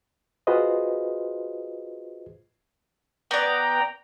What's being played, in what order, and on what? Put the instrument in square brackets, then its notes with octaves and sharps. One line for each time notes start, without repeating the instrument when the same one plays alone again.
[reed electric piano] F4 F#4 G#4 B4 C5 D#5
[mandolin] B3 D5 [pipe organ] G5 A#5